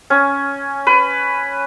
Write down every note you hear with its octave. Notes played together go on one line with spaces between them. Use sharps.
C#4
B4